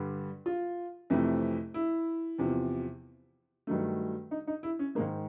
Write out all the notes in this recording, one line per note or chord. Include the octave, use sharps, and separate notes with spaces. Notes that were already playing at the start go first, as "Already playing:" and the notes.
Already playing: G2 D3 G3
F4
F2 C3 E3 A3
E4
E2 C3 F3
G2 D#3 F#3 A3
D#4
D#4
E4
C#4
G#2 D#3 G#3 A#3